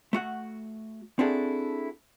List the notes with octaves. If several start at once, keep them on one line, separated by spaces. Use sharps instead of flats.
A3 F#4 F#5
C4 D4 E4 F#4 G#4 A4